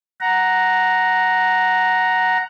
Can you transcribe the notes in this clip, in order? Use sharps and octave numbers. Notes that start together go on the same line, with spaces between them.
F#5 A#5